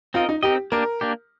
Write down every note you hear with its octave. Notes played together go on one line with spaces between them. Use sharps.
C4 D#4 F4 A#4 D#5
D#4
C4 D#4 G4 A#4 D#5
A#3 D4 G4 A#4
A#3 D4 G4